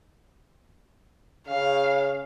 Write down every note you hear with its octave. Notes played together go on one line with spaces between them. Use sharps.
C#3 F5